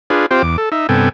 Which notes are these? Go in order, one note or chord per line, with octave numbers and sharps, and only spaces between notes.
D4 F4 G#4 B4
C4 F4 G4 C5 G5
E2 D6
A4
D#4 E5
G2 C3 B3 A4 G5 G#5